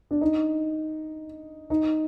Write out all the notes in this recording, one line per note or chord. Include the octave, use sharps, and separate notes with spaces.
D4
D#4
D#4